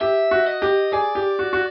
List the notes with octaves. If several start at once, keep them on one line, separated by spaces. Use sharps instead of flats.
G4 E5
F#4
D#5
G4
G#4 D5
G4
F#4
F#4